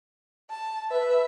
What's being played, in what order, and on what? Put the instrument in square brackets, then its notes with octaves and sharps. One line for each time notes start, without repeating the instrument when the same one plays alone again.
[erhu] A5
[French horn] B4 [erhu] E5